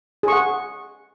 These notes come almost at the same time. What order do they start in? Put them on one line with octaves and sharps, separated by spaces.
G#4 C#6 F#5